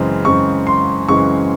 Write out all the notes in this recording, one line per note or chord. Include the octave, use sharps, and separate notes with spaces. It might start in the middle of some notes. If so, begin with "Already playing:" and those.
Already playing: F#2 C#3 E3 G#3 C4
F#2 C#3 E3 G#3 C4 C#6
C6
F#2 C#3 E3 G#3 C4 C#6